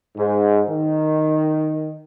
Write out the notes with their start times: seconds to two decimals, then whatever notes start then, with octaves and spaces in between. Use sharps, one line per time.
0.16 G#2
0.68 D#3